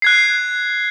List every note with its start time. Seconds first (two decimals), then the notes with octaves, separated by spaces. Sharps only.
0.02 F#6 G#6 C7